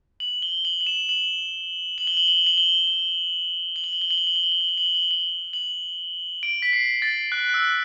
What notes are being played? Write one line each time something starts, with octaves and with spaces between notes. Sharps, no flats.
F#7
G7
F#7
F#7
E7
F#7
F#7
G7
F#7
F#7
G7
F#7
G7
G7
F#7
G7
F#7
G7
F#7
G7
F#7
G7
F#7
G7
F#7
G7
F#7
G7
F#7
G7
F#7
F#7
D7
B6
C7
A6
F#6
F#6
E6